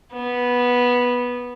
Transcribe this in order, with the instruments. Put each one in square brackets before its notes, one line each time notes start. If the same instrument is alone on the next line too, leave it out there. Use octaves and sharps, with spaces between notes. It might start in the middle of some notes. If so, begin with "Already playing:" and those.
[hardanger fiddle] B3